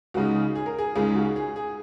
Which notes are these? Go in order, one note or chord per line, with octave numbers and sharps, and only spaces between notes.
C#2 C#3 G#3 D#4 F#4
G#4
A#4
G#4
C#2 C#3 G#3 D#4 G#4
F#4
G#4
G#4